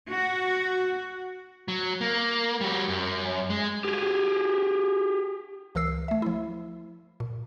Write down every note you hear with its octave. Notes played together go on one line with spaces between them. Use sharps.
F#4
F#3
A#3
G3 F#4
F#2
G#3
G4 G#4
C#2 E3 A#4 E6 C7
A3 E5
F3 E4
A#2